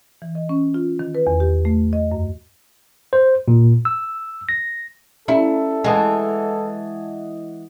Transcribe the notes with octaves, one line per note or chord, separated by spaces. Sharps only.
E3
D#5
C#4
F4
D#3
B4
E2
G4
A3
D#5
F#2
C5
A#2
E6
A#6
C#4 E4 A4 D5 E5
E3 G#3 D#5 F#5 G#5 A5 D#6